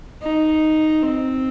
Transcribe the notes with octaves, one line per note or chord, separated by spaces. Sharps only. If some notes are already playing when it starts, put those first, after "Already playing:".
D#4
C4